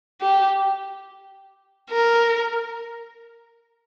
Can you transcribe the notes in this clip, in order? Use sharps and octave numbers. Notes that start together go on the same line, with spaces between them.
G4
A#4